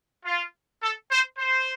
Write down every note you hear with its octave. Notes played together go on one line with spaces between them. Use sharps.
F4
A4
C5
C5